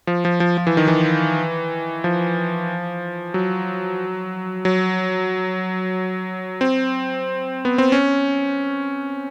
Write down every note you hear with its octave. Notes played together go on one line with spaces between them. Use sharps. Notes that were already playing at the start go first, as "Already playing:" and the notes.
F3
F3
F3
F3
E3
D#3
E3
F3
F#3
F#3
C4
B3
C4
C#4